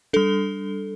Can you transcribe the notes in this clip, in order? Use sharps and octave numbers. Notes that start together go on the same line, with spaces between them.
G3 D4 A4